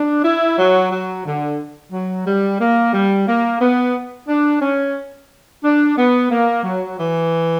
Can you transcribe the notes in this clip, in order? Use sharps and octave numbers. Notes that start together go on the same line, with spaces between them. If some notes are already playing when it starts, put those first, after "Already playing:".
Already playing: D4
E4
F#3
F#3
D3
F#3
G3
A#3
G3
A#3
B3
D4
C#4
D4
B3
A#3
F#3
E3